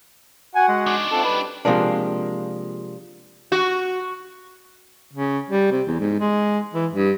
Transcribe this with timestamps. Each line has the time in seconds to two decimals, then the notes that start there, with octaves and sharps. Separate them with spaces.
0.55 F#4 F#5 G#5
0.68 G#3
0.86 D4 D#4
1.11 C4 F4 A4
1.24 G3 B4
1.65 C3 F3 G#3 A#3 D4
3.52 F#4
5.13 C#3
5.50 G3
5.71 C3
5.87 E2
6.00 G#2
6.20 G#3
6.74 E3
6.94 G2